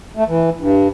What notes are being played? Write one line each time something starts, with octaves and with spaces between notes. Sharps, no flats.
A3
E3
G2